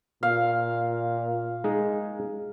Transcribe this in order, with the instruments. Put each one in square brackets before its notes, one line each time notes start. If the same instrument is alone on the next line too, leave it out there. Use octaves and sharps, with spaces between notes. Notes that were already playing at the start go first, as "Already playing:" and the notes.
[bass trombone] A#2 [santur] F5
[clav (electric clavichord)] G#3 D#4 G#4